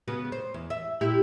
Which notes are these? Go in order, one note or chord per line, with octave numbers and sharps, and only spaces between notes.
C#3 B3 F#4
C5
E2
E5
A#2 E4 G4